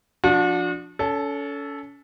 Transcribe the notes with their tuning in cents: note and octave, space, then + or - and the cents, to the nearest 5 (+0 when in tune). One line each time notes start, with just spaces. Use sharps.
F3 +0 D4 +0 F#4 -40
C#4 +35 A4 +0